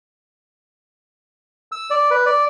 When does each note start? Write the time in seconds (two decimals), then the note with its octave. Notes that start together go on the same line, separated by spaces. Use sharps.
1.72 E6
1.90 D5
2.11 B4
2.26 D5